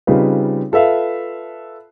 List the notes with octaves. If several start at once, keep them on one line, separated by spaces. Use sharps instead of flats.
C#3 G3 C4 D#4 F4 B4
F4 A4 B4 E5 F5